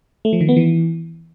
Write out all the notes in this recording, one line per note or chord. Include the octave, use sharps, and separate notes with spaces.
A3
F3
D#3
B3
E3